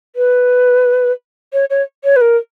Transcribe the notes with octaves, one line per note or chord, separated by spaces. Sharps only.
B4
C#5
C#5
C#5
B4
A#4